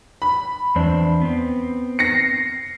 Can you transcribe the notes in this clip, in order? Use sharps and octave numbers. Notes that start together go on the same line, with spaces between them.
B5
E2 C4 D4
B3 C4
A#6 C7 C#7